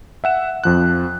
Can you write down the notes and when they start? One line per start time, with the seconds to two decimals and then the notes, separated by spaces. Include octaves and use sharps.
0.24 E5 F#5 E7
0.64 F2 F3 F#6